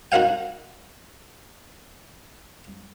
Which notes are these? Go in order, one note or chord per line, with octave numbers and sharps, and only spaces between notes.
D#4 F#4 A#4 C5 F5 G5